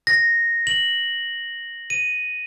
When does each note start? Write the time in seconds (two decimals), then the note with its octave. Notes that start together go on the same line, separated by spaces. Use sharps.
0.07 A#6
0.67 F#7
1.90 D#7